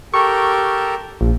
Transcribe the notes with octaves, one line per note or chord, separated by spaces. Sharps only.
G4 A4 A#4 C#6
A#1